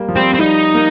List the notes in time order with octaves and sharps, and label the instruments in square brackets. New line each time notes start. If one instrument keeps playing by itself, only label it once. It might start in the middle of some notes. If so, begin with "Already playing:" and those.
Already playing: [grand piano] G3 A#3
F3
[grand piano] G3 [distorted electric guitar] C4
[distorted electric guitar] C4
[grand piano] G3 [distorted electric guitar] D#4
[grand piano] A#3